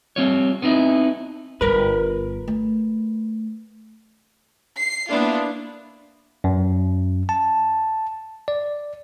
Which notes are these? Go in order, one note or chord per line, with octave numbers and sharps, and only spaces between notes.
G3 C4 F4 C#5
B3 C4 D#4 E4
G1 G2 A#4 B4
A3
C7
A#3 B3 D4 E4 F4
F#2
A5
D5